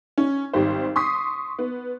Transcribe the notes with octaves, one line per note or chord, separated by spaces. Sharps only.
C#4
G#1 D#3 G3 G4 C5
C6 C#6 D#6 B6 C7
B3